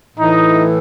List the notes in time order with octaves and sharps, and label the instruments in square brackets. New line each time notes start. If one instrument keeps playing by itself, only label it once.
[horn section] A2 E3 D#4